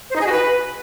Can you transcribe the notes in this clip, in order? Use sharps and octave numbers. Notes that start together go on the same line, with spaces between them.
C5
D#4
G#4
F#4
B4